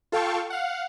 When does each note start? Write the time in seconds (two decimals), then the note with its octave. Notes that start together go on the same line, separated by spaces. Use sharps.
0.12 F4 A4 F5 G5 A5 C#6
0.50 F5 F#5